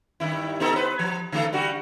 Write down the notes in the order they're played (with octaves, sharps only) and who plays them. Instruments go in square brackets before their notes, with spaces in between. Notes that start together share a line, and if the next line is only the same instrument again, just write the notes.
[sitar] G2 D#3 E4
B3 D#4 A4
B4 C5
F3
D3 A3 A4
G3 D4 F#4